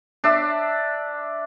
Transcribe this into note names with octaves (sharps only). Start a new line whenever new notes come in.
D4 E5